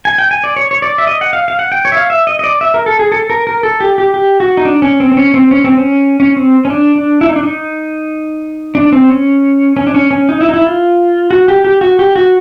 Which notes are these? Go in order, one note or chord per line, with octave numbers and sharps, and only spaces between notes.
G#5
G5
G#5
D5
C#5
C#5
D5
E5
D#5
F#5
F5
F5
F#5
G5
C#5
E5
F5
E5
D#5
D#5
D5
E5
A#4
A4
G#4
A4
A#4
A#4
A4
G4
G4
G4
F#4
D#4
D4
C#4
C4
C4
C#4
C4
C#4
C4
C#4
C#4
C4
C#4
D4
D4
E4
D#4
D4
D#4
D4
C4
C#4
C#4
D4
C#4
C#4
D#4
E4
D#4
E4
F4
F#4
G4
G4
F#4
G4
F#4